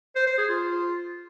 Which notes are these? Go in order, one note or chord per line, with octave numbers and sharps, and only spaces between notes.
C5
C5
G#4
F4